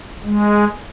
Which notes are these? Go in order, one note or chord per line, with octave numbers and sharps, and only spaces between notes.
G#3